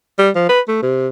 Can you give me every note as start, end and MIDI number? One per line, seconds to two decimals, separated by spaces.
0.18 0.30 55
0.35 0.49 53
0.49 0.61 71
0.68 0.79 57
0.82 1.08 48